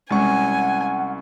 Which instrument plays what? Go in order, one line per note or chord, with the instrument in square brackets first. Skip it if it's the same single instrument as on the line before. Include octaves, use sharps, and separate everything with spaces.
[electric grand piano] C2 C#4 C#6 [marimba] G#3 [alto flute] F#5 [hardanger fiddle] G#5